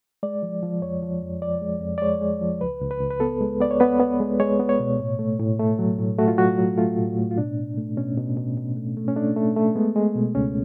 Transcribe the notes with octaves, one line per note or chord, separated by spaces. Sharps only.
G#3 D5
F3
F3
F2 C#5
F3
F2
F3 D5
G#3
F2
D5
G#3 C#5
G#3
F3
C#2 B4
C#2
B4
C#2
B4
B3 A4
G#3
B3 D5
C#5
B3 B4
B3
G#3
G#3 C#5
B3
C#5
B2
A2
A3
A2
A3
F#3
A2
A3 F#4
F4
F#3 F#4
F#3
A3 F4
A2
A2
F4
B2 D4
B2
A3
B2 C#4
B2
B2
B2
A3
A3
C#4
A3 D4
A3
A3
G#3 B3
G#3
B2
C#2 C#4